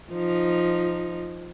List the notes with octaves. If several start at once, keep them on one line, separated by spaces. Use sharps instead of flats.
F3 D#4